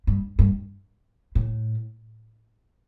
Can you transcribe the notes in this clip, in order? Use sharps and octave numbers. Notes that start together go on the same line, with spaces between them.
G2
G2
A2